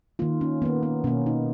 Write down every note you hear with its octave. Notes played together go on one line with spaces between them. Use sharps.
D#3 A#3 F4
C#4
D#3 A#3 B3
B3
B2 A#3 C#4
D#4